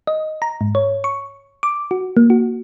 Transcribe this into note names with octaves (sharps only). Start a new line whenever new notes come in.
D#5
A#5
G#2
C#5
C#6
D6
F#4
A#3
F#4